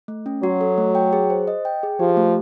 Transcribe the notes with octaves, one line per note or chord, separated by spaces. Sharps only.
A3
C#4
F#3 F#4
A4
A3
G5
G#4
C5
D#5
G5
G#4
F3 G4
A3